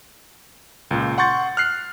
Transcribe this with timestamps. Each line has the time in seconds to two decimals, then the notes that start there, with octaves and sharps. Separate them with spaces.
0.91 C#2 A#2
1.18 F#5 C6 C#6 G6 A6
1.57 F6 F#6 C7